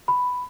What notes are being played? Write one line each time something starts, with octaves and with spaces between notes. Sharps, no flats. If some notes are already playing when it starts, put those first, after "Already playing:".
B5